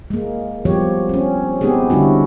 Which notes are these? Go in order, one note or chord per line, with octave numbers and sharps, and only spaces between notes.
G#3 A#3
F3 G3 B3 G4 C#5
C4 C#4
G#3 B3 C4 D#4 G4 G#4
D3 G3 C#4 D4 E4 F#4